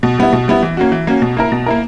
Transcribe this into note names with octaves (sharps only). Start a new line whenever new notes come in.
B2
G3 B3 E4
B2
G3 B3 E4
E3
A#3 C#4 F#4
E3
A#3 C#4 F#4
B2
A#3 E4 A#4
B2
A#3 E4 A#4